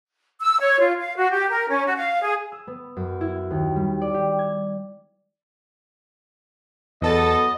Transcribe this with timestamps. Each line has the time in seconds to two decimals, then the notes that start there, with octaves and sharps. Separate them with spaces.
0.41 E6
0.60 C#5
0.80 F4
0.99 F5
1.16 F#4
1.32 G4
1.50 A#4
1.69 C#4
1.86 F#4
1.98 F5
2.22 G#4
2.52 E6
2.67 B3
2.97 F#2
3.21 E4
3.51 D#2
3.76 G3
4.01 D5
4.14 G4
4.39 G#6
7.02 E2 F#3 B3 A4 D#5 A6